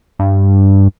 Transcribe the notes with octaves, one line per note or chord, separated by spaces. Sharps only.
G2